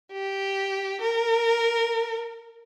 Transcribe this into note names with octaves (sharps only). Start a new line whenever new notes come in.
G4
A#4